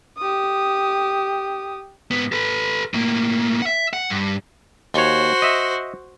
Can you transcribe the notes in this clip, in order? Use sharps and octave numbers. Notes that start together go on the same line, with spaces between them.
G4 D#6
G#2 B3
A4 B4
A2 A#3
E5 F#5
F#5
G2
D#2 F#4 C5 C#5
D#5 E5